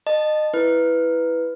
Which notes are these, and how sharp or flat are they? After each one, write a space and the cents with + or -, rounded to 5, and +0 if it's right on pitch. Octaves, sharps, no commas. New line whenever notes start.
D#5 -25 A5 +0
E4 +0 B4 +0